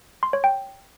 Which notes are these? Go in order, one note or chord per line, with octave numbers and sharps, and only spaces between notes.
C6
C#5
G5